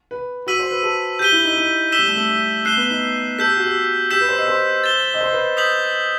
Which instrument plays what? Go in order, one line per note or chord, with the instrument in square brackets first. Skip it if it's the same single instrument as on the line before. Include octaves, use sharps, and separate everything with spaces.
[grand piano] B4
[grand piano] F#4 [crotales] E6 B6 D#7 F#7
[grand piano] C5
B4
A4
[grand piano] G4 [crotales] G6 B6 D#7 G7
[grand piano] E4
D#4
D#4
[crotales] E6 B6 E7 G7
[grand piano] G3
A3
A3
A3
[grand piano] A3 [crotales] F#6 C7 E7 G7
[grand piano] B3
D#4
[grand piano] A4 [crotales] E6 G6 B6
[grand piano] G4
F#4
G4
[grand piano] G4 [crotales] E6 G6 B6 E7
[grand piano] B4
C5
D#5
C5
[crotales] A6 E7 G7
[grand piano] D#5
C5
B4
[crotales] D#6 G6 B6 F#7